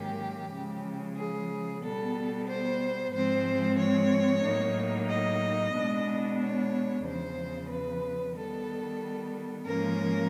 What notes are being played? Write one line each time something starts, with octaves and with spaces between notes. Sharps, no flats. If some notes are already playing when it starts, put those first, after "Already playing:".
Already playing: G#2 D#3 F#3 A#3 C#4 G4
C#3 F3 G#3
G#4
B2 G3 B3 A4
C5
G#2 F3 G#3 C4 C5
C#5
A2 F#3 A#3 D#4
D#5
B2 G#3 B3 D4
C#5
E2 C#3 F3 C5
B4
D#3 G3 B3 A4
G#2 F3 A#3 C#4 A#4